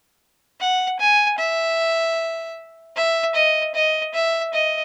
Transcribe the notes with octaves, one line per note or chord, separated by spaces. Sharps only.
F#5
G#5
E5
E5
D#5
D#5
E5
D#5